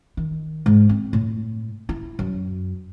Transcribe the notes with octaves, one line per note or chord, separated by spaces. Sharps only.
D#3
G#2
C4
A2
E4
F#2